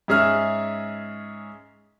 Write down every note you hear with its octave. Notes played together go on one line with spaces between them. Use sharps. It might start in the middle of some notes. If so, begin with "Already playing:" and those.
G#2 C#4 G#4 E5 F6